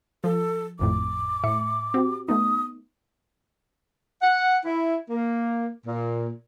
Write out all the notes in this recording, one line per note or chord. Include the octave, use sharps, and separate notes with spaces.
F3 A4
G#1 F2 A2 D6
A2 E5 C#7
C4 F#4 G4
A3 B3 D#4 D#6
F#5
E4
A#3
A#2